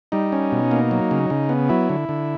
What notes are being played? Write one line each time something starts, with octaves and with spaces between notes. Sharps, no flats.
G3 D#4
C#4
B2
A#3
F#3
C#3
C#3
B3
F#3 E4
D3
D3